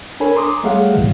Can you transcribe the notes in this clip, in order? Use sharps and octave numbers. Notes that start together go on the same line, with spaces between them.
D4 A4 A#4 C#5 G#5 B5
A#5 C6 D6 D#6
G3 A3 G#4 C#5 F5 F#5
C2 G#2 B2 D3 E3 G3